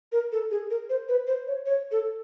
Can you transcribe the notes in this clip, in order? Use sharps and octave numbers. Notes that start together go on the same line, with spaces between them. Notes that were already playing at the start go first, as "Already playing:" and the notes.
A#4
A4
G#4
A#4
C5
B4
C5
C#5
C#5
A4